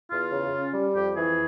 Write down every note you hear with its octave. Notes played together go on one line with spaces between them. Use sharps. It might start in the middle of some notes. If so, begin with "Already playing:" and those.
E2 F4
C#3
C#4
G3
F2 G4
E3 G#4